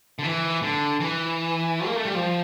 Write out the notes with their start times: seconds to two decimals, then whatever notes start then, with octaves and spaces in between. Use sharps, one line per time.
0.19 D3
0.24 E3
0.62 D3
1.00 E3
1.86 A#3
1.96 A3
2.05 G3
2.15 F3